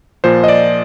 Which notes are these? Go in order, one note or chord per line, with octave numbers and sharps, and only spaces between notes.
A#2 F3 C5
D#5
D5